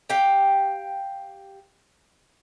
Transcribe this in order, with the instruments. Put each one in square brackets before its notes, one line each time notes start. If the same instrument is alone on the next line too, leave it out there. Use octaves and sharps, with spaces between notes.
[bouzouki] G4 F5 G5